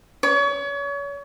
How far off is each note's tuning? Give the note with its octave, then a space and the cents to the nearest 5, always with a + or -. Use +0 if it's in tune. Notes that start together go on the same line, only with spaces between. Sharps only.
C#5 +35